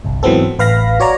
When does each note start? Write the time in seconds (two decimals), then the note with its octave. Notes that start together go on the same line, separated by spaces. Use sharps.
0.05 G1 C2
0.23 G#2 E3 F#3 B3 C4 A4
0.59 A1 B4 F5 B5 A#6
1.00 F#4 C#5 D5 A#5